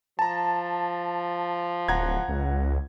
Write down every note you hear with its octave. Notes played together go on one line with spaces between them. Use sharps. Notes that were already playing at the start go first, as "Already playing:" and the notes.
F3 A5 A#5
D1 F#5 A#5 G#6
C#2